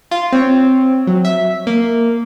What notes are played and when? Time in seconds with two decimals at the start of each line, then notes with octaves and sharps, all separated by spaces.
0.11 F4
0.32 C4 C#5
1.07 F#3
1.25 E5
1.67 A#3